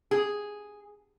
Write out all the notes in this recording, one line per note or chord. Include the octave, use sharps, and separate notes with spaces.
G#4